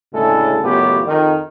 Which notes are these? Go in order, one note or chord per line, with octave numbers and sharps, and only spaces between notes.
D2 A2 C#3 G#3 E4 A4
A1 F#2 C#3 B3 F4 G4
F2 D#3